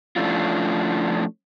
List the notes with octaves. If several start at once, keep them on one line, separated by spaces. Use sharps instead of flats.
F3 A3 C#4 D4 E4 F4